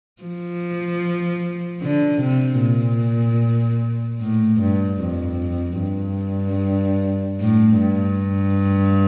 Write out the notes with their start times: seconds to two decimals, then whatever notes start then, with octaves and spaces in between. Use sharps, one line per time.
0.23 F3
1.82 D3
2.22 C3
2.61 A#2
4.21 A2
4.61 G2
5.01 F2
5.81 G2
7.41 A2
7.80 G2